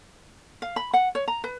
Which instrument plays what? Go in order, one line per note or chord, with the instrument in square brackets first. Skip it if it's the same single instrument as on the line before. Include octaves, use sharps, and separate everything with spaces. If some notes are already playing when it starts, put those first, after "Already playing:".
[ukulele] F5
B5
F#5
C#5
A#5
B4